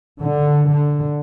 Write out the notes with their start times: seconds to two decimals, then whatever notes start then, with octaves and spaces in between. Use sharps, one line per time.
0.21 D3
0.71 D3